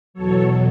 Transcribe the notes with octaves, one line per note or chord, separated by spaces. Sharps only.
E2 B2 F#3 A4 C#5